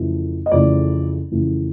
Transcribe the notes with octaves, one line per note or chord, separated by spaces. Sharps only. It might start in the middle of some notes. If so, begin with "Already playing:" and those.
Already playing: F2 C#3 E3 A3
D#5
F2 C#3 E3 A3 D5
F2 C#3 E3 A3